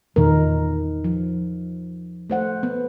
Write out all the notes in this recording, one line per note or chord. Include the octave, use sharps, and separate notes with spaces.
E2 A#2 D#3 D#4 A#4
F3
A3 C5 F#5
A3 B3